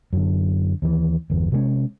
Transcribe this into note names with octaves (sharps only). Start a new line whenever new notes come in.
F#2 D3
D#2 E3
G1 E2
C3 G#3 B3 C#4